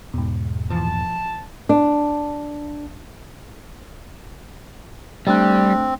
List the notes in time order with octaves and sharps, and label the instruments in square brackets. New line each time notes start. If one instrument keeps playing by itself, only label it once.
[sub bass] E2 [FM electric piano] G#2 B2
[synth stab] A#2 E3 F3 [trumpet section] A5
[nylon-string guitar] D4
[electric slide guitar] G3 [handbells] A3 D4 F#6 [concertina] C4